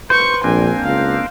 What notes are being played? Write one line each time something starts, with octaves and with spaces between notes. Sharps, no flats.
B4 C5 C#6
A#1 A#3 C4 D4 G#5
C#2 F5